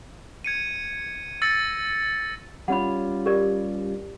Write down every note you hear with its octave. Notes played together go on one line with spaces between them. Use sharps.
G#6 C#7 D#7
E6 A6 A#6 C#7
G3 C#4 F4 F#5 B5
G4 A#4 D5